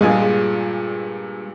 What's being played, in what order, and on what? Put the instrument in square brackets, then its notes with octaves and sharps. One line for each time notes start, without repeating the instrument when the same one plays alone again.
[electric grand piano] G2 A#2 G#5 [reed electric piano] G#3 F4 G#4